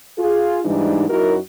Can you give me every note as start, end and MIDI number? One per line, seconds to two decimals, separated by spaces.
0.18 0.59 65
0.18 0.59 68
0.65 1.08 44
0.65 1.08 52
0.65 1.08 55
0.65 1.08 62
0.65 1.08 63
1.09 1.36 42
1.09 1.36 63
1.09 1.36 64
1.09 1.36 66
1.09 1.36 70